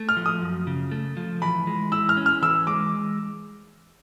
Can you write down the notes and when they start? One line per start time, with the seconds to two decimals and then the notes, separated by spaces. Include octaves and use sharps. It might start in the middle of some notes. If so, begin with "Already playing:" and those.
Already playing: A3
0.09 F6
0.17 F3
0.26 D#6
0.42 F#2
0.67 C#3
0.91 A3
1.17 F3
1.42 E3 B5
1.67 G#3
1.92 E4 E6
2.09 F6
2.17 C#4
2.26 F6
2.42 E3 E6
2.67 G#3 D6